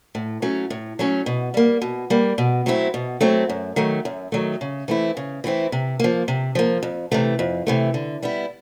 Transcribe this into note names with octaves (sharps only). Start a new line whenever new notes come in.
A2
F#3 A3 C#4
A2
F#3 A3 C#4
B2
G3 A#3
B2
G3 A#3
B2
F#3 A3 C4 E4
B2
F#3 A3 C4 E4
F#2
D#3 F#3 A3
F#2
D#3 F#3 A3
C#3
E3 A3 C4 E4
C#3
E3 A3 C4 E4
C3
F3 A#3
C3
F3 A#3
F2
C3 E3 A3
F2
C3 E3 A3
D3
G3 B3 E4